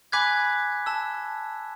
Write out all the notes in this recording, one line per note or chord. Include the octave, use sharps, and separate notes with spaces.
G#5 B5 D6 F#6 G#6 B6
A5 E6